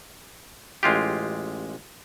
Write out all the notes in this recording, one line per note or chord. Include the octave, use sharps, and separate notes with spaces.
A1 G#3 F4 G4